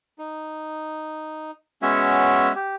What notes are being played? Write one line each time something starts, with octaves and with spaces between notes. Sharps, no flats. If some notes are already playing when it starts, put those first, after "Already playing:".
D#4
G#3 B3 C#4 F#4 C#5 E5
G4